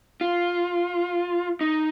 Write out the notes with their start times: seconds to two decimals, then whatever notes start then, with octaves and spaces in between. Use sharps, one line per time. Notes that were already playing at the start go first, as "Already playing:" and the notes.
0.21 F4
1.61 D#4